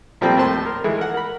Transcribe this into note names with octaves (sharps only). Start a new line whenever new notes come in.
A#2 F3 G3 A3 A#3 C4
D#2 A2 C5 A5 C6
A#4
E3 G#3 A3
A#4 F#5
A#4 B5